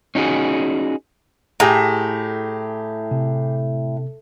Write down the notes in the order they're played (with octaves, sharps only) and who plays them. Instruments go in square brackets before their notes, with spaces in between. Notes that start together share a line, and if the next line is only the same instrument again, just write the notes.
[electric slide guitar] C#4 D#4 F#4 G#4
[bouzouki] A2 [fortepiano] G4 G#4 A#5
[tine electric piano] C3